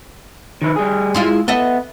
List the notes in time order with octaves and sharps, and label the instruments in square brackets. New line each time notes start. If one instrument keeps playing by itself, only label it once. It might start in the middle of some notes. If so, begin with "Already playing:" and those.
[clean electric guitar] D#3 B4
G3 G#4
[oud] G#3 E4 F4
[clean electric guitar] B3 [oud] A4 D#5 E5